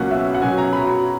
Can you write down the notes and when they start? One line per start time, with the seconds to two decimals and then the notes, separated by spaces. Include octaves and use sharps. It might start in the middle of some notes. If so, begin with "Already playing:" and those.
Already playing: C#2 B2 F#3 A#3 C#4 F#5
0.11 E5
0.35 F#5
0.42 B2 F#3 C#4 G#5
0.58 A#5
0.73 B5
0.88 A#5